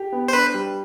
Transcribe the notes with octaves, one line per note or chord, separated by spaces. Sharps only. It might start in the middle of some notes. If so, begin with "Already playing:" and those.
Already playing: G4
B3
C5
D4 B4
G3